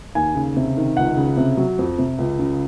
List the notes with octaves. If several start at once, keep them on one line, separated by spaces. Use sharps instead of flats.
D#2 G#5
C#3
C3
D#3
C#2 F#5
C#3
C3
F#3
F2
C3
C#2
C#3